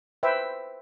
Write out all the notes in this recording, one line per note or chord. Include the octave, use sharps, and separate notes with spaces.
B4 C5 E5 G5